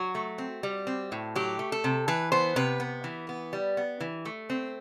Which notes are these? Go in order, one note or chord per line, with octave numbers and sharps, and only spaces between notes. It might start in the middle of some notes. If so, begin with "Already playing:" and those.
Already playing: F#3 F#4
A3
C4
G3
C4
A2
F#3 G4
A3
A4
C3
E3 B4
B3 C5
C3 B4
B3
E3
B3
G3
B3
E3
A3
C4